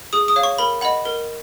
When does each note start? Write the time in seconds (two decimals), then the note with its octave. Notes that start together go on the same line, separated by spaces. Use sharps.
0.13 G#4 D#6
0.28 D#6
0.36 C#5 F5
0.43 C#6
0.58 A#4 B5
0.81 D#5 F#5 B5
1.05 A#4